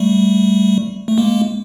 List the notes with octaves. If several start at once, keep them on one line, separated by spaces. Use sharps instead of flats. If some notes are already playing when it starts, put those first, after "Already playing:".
Already playing: G3 A3
A3
G#3 A#3